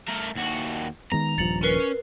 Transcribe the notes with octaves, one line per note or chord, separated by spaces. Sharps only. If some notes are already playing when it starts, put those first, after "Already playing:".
A3 A#4
D#2 F#4
D#3 G#3 B3 A#5
D#1 G2 F3 A6 C#7 F#7
C#4 A#4 B4 C7